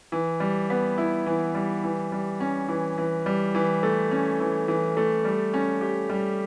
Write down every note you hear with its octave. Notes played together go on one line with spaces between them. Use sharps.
E3
G3
B3
E4
E3
G3
E3
G3
C#4
E3
E3
G3
E3
A3
C#4
E3
E3
A3
G3
C#4
G4
G3